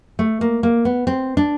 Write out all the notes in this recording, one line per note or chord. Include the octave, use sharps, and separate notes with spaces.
A3
A#3
A#3
B3
C4
D4